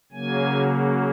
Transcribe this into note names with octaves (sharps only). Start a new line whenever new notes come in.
C#3 F#3 A#3 G#5